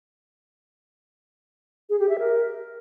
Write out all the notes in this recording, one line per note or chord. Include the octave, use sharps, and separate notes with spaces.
G#4
G4
E5
A#4